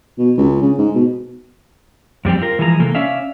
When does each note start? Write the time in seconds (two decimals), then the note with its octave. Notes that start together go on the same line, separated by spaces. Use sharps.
0.18 B2
0.37 C#2
0.62 C#3
0.78 G#2
0.95 B2
2.25 F2 G3 C4 G4
2.42 F4 A#4
2.59 E3 F3 G#3 A5 A#5
2.79 C3 E3 A#3 A4
2.95 C#4 D5 E5 F5